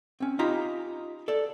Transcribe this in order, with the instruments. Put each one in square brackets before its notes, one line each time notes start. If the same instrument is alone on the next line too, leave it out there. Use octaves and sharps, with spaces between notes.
[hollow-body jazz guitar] C4 C#4
D#4 F4 G4 A#5 B5
A4 D5